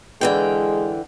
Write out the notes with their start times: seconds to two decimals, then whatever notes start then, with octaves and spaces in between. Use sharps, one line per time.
0.21 D3 E3 G#3 G5